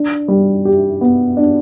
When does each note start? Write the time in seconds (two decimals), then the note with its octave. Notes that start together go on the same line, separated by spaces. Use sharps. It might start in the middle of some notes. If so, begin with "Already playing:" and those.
Already playing: D4
0.28 G3
0.65 G4
1.01 B3
1.37 D4